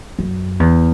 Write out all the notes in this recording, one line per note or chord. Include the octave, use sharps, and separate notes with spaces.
F#2
E2